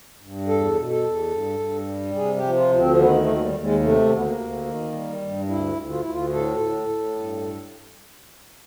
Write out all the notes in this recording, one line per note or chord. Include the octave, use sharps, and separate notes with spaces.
G2
E2 A4
B2
A4
E2
G2
G2
G3
C3 G#4
G4
F3
F4
D2
C4
D#3 B3
A#3
A3
D#2
G3
D#2
G#3
C3 A3
D2
B3
A#3
D2
D#3
G3
G2
D2 E4
D2
F4
D2 E4
F4
A2 A4
A2
A2
G2